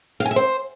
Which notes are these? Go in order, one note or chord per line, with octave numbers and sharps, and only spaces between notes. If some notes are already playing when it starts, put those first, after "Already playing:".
F5
G#5
E5
C5